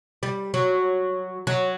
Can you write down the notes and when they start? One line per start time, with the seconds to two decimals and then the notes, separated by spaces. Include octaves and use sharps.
0.23 G3
0.54 F#3
1.47 F#3